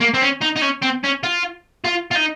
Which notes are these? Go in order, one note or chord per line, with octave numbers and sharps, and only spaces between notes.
A#3
C4
C#4
D#4
D#4
C#4
C4
C#4
F4
F4
F4
D#4